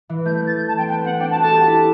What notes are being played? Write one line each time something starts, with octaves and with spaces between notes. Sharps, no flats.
E3
A3 G6
G6
A6
G6
A5
C4 G5
B3 G5
C4 F#5
D4 G5
A5
F#4
A4 A5
G4
E4